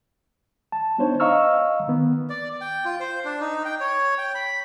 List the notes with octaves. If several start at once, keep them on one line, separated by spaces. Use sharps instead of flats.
A5
B3 D4 D#4 C5 C#5
D#5 F5 A#5 C#6 E6 F6
D#3 B3
D5
G5
F4
C5
D4
D#4
G5
C#5
G5
B5